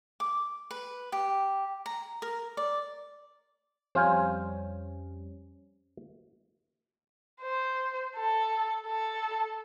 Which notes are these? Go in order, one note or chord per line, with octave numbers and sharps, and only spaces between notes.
D6
B4
G4
A#5
A#4
D5
F2 G3 C#4 C5 F5 G#5
C5
A4
A4